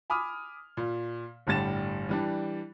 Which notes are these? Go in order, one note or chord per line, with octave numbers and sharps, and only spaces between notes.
G#5 B5 D6 D#6 F6
A#2
G1 A2 D3 G3 A6 E7
E3 G3 D4